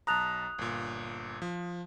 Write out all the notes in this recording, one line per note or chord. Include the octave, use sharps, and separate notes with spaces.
B1 A5 A#5 D#6 F#6 F7
G1 A#2
F3